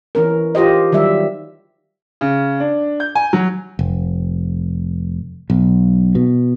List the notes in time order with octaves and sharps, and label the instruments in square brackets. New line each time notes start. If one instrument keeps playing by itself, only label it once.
[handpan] E3 C#4 A#4
F4 G4 C5 D#5
D#3 F#3 G3 E5
[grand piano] C#3
D4
G6
G#5
F#3
[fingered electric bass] F1
B1
B2